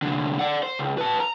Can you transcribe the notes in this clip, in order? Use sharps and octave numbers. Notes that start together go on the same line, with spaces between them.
C2 D3
D5 F#5
C5
C#2
B4 A5
A#5